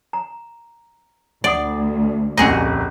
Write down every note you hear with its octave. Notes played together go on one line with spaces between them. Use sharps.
A#5
D2 D5 E5 F#5 D#6
D#1 C2 F2 C#4 F#4 G#4 D#5 A#5